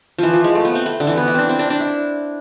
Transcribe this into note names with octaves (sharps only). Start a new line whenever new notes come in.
E3 F3
F3
G#3
A3
B3
C4
A3
D3
E3
B3
E4
C4 D4
C4
D4
D4
E4